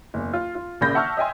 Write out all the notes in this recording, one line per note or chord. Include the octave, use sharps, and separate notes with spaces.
F#1 E2
F4
F4
A#1 C#3 A#3 B5 G6 A#6
E5 F#5 A5 C#6 E6 F6
D#5 E5 G5 G#5 C6